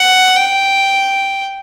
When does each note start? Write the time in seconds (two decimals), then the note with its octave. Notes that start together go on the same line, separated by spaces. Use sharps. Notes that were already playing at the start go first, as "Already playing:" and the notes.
Already playing: F#5
0.36 G5